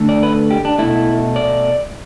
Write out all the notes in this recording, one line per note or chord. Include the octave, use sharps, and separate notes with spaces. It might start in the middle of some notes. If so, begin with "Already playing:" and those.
Already playing: D3 A3
D5
B4
G4
D4
B2 A3 E4
D5